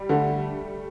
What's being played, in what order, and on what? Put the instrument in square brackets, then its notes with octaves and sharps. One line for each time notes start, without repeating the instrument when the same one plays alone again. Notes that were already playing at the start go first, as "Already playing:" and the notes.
Already playing: [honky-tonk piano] G3
[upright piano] D3 [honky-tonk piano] A3